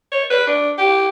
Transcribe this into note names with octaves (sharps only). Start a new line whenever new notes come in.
C#5
B4
D4
G4